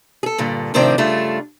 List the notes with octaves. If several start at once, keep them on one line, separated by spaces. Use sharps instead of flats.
G#4 A4
G2 A#2 D3
A2 C3 D#3 F3 C4 D4
G2 C#3 A3 D4 F4